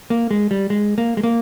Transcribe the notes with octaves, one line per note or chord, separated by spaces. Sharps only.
A#3
G#3
G3
G#3
A#3
G#3
A#3